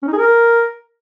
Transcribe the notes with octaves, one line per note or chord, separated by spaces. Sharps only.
C#4
D#4
G#4
A#4